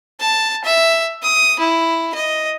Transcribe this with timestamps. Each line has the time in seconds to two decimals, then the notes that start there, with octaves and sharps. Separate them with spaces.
0.20 A5
0.64 E5
1.23 D#6
1.59 E4
2.14 D#5